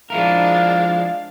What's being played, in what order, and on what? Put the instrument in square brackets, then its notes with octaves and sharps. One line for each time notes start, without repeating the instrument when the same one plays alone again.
[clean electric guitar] F3 E4 A#4 [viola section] G#3 D4 [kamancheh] F5